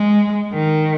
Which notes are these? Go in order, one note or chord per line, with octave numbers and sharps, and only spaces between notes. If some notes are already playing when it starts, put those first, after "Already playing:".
Already playing: G#3
D#3